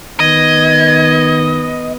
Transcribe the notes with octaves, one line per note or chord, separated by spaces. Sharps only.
D#3 B3 D#5 G#6